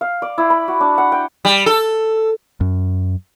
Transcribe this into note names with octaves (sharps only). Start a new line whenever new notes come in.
F5
D5
E4
B5
F#4
D4
F#5
G5
G3
A4
F#2